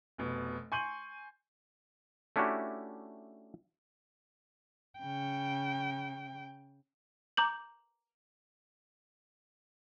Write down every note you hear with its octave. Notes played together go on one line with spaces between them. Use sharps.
F1 B2
G#5 C6 C#6 G6 D#7 F#7
A3 C#4 D4 E4 F#4 G4
C#3 G5
A#5 D6 G6 F#7